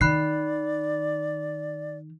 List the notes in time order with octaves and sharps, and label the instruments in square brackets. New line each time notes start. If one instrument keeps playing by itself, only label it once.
[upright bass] D#3 [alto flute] D5 [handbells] B5 F#6 C7